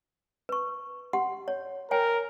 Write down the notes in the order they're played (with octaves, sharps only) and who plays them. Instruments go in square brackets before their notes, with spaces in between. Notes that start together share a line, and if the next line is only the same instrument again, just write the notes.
[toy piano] B4 C#6
G4 F#5 C6
C#5
[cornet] A#4 [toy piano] C#5 G5 G#5